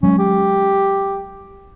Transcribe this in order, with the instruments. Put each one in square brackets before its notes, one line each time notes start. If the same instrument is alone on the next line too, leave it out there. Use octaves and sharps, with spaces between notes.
[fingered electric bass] F#3 G#3 [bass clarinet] C#4
[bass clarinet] G4